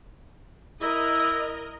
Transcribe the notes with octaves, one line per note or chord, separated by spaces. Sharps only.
E4 A#4 D#5